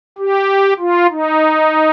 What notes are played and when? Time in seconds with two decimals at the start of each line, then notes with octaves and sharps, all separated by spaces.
0.18 G4
0.79 F4
1.10 D#4